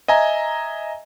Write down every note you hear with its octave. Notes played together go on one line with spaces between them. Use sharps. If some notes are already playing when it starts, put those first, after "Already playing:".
D#5 E5 G#5 A#5